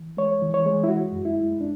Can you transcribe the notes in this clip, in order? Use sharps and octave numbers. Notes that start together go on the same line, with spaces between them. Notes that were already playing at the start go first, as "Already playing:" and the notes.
Already playing: E3
G#3 C#5
E3
C#5
G#3
E4
G#3 F#4
F#2
E4
G#3
D4